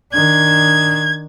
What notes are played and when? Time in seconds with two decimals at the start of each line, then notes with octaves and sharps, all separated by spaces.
0.13 D#3 D4 G#6